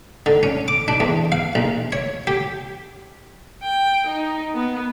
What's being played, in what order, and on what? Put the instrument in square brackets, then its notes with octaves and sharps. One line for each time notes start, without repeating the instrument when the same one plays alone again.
[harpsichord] D3
C#4
D6
D4
E2
F5
A#1
C#5
G4
[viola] G5
D#4
B3